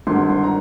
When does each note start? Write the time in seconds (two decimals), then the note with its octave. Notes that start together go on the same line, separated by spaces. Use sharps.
0.07 G#1 G2 D3 C6
0.30 C6
0.44 A#5